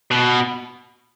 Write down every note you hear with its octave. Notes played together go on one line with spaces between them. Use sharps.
B2